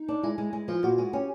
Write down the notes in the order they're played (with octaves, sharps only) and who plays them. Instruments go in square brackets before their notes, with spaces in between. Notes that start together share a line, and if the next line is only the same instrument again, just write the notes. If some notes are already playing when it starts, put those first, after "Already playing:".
Already playing: [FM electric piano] D#4
[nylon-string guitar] D4
[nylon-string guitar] G#3 [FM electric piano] E4
[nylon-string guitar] G#3
G#3
[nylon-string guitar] F3 [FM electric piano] F4
[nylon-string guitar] A#2 [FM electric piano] F#4
[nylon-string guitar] G#3 [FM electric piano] F#4
[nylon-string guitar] C#4 [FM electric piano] G4